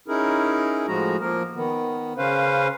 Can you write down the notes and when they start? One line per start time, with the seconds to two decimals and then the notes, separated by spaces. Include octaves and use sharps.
0.08 C#4 D#4 E4 G#4 A#4
0.88 A2 F3 G#3 F#4 A#5
1.21 F3 A#3 A#4
1.56 D#3 B3
2.18 C#3 C#4 B4 C5 F5